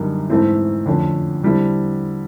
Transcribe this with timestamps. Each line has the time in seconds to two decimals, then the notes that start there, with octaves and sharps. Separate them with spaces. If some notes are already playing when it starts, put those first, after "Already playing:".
Already playing: F#2 D3 G3 A#3 D#4
0.30 G#2 E3 A3 C4 E4
0.86 F2 D3 F3 A3 C#4
1.43 D3 G3 C4 E4